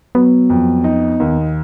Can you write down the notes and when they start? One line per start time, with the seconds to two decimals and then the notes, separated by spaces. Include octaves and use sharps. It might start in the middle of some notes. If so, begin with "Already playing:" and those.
0.15 F#3 B3
0.50 F2
0.84 D#4
1.20 D#2